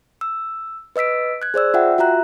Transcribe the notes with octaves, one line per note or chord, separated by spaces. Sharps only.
E6
B4 D#5 E6 B6 D7
F#6 G#6
G#4 C5 D5 E6
F4 E5 F#5 G5
F4 F#4 E5 A#5 F#6